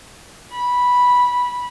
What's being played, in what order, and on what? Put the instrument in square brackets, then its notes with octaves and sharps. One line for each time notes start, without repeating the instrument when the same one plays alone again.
[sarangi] B5